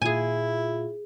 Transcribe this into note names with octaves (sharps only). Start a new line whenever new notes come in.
A#2 E4 F4 G#4 G#5